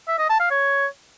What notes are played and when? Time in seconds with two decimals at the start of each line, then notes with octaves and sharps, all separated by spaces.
0.08 E5
0.19 D#5
0.29 A5
0.40 F5
0.51 C#5